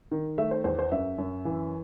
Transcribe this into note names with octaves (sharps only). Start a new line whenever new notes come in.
D#3
A3 E5
C5
E2 C5
C5
F#2 E5
F#2
E3